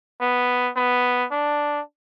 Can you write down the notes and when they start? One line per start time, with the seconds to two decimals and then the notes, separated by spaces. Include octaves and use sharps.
0.21 B3
0.76 B3
1.32 D4